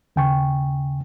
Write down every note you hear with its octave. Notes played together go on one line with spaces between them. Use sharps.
D#2 C#3 G5 G#5 C#6